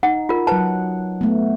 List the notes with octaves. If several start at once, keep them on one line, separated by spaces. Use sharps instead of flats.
D#4 F#5
F4 A#4
F#3 B4 F#5 A5
A3 B3